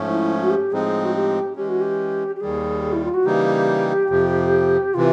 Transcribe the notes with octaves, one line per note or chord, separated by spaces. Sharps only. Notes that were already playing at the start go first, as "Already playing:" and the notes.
Already playing: G#2 F3 A3 C#4
E4
F#4
G4
A2 F3 G#3 C4 D#4 G#4
F#4
G4
E3 G#3 C#4 G4
F#4
G4
G4
D#2 D#3 G3 G#4
E4
F4
F#4
C#3 E3 G3 A#3 D#4 G4
F2 C3 F3
C3 E3 F4